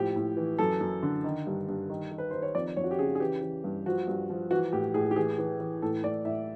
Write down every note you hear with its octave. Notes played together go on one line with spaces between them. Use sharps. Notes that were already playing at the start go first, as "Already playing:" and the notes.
Already playing: A2 F3 G4
A2
E3
F#2 A4
F#2
D3
D#3
G2
G2
D#3
D#3
B4
D#3 C5
C#5
F2 D5
F2 C#5
F#4
G4
C#3 G#4
G#4
E3 G4
E3
G2
F3 F#4
G2
F3
E3 F#4
A2 G4
A2 G#4
G4
E3 G#4
E3
E3
A2 A4
A2 D5
A2 E5